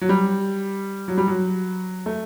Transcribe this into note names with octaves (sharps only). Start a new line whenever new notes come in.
F#3
G3
F#3
G3
F#3
A3